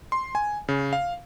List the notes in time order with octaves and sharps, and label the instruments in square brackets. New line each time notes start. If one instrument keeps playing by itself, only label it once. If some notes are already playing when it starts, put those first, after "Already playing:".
[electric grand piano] C6
G#5
C#3
F5